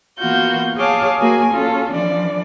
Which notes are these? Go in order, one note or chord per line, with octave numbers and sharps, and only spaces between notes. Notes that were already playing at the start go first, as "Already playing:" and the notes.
E3 A#3 B3 F4 F#4 G6
G#4 C#5 F5 A5 D6
A#3 F#4 G#4 G#5
C#4 F4 A4
E3 F3 D4 D5